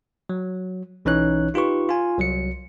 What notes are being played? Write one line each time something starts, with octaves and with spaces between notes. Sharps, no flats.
F#3
B1 E3 C#4 D#4 C#5 F#6
D#4 F4 G4 B4 C#6
F4 G#5
C2 F#3 C#7